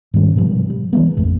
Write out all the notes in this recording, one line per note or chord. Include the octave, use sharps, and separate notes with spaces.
G#2 D#3 G3 C#4
G#2 B2 F3 G3
G3
E3 F#3 G#3 B3
A1 F2 A2 A3